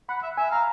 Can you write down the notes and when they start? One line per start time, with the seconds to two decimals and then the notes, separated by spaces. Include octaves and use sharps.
0.09 F#5 B5
0.23 E5
0.37 E5 G#5
0.50 F5 A#5